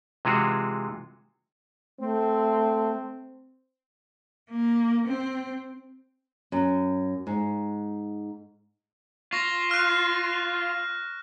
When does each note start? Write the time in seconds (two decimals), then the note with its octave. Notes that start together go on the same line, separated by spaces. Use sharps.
0.25 C3 E3 G#3 F4 F#4 G#4
2.00 A3 C4
4.50 A#3
5.07 C4
6.52 F#2
7.27 G#2
9.32 F4 C#6 A#6
9.71 F6 F#6